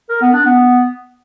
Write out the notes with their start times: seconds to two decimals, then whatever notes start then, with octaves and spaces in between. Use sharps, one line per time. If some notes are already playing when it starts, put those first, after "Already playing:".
0.09 A#4
0.21 B3
0.33 D4
0.45 B3